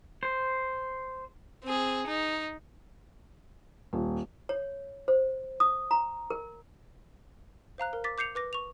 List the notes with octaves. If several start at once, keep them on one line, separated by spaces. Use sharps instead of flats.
C5
C4 G#4
D#4
D#1
C#5
C5
D#6
A#5
A#4
C5 F5 A#5 F#6
A#4
D6 A6 B6
D6 G6 C7 C#7 F7
B4 D6 A#6
C#6 F7